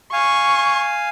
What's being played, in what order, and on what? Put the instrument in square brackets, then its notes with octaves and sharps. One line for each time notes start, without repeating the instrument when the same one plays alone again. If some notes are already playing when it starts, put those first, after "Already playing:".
[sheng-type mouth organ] F5 G#5 [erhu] C#6